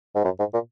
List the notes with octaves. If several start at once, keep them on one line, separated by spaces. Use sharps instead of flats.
G#2
F#2
G#2
A#2